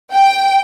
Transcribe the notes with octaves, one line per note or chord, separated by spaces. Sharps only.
G5